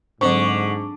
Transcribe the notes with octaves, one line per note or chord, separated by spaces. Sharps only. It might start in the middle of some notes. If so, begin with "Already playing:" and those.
G#2 D3 F#3 C4 C5 C#6